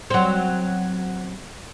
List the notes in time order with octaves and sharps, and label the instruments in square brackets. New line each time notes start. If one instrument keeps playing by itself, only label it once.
[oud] F#3 C4